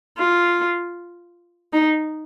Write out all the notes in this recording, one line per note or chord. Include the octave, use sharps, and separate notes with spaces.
F4
D#4